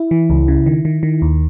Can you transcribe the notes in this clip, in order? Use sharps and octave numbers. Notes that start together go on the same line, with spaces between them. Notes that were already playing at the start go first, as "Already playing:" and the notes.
Already playing: E4
E3
C#2
C#3
D#3
D#3
D#3
D#2